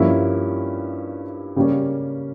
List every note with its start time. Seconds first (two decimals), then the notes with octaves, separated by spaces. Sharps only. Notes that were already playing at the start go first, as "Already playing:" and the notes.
Already playing: G2 F3 A#3 C#4 E4
1.56 C#3 G3 A#3 C#4